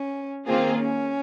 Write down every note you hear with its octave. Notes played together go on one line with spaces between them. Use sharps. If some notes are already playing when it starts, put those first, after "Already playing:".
Already playing: C#4
D#3 A#3 C4 F4 G#4
C#4